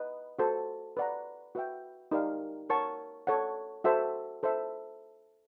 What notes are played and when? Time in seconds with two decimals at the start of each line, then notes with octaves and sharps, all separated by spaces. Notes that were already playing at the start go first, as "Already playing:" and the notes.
Already playing: B4 D#5
0.39 F#4 A4 C5
0.97 B4 D5 F#5 A#5
1.55 F#4 B4 E5 G5
2.11 D#4 G4 A#4 D5 F5
2.70 A#4 C#5 F#5 A5 C#6
3.27 A4 C#5 F#5
3.84 F#4 A4 C5 E5
4.43 A4 C5 E5